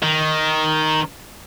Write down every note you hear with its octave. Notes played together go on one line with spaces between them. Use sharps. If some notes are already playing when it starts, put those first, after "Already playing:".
D#3